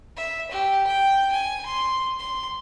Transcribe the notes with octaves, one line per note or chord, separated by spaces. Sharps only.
E5
G4
G5
G#5
C6
C6